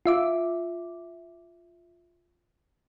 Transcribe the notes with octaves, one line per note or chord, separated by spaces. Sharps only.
F4 E5 D6